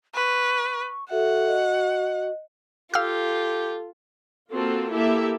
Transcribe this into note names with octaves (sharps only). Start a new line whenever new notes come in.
B4 C#6
F#4 A4 E5 F#5
D#5
F4 G4 A4 F5 E6 F6
A#3 C4 F4 F#4 A4
A#3 E4 G4 A4 E5